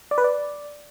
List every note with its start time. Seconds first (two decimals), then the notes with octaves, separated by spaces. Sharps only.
0.11 D5
0.18 B4
0.24 D5